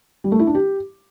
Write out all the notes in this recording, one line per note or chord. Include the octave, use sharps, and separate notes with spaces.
G3
A3
E4
D4
G4